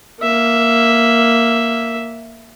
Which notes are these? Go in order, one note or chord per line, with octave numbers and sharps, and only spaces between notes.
A#3 E5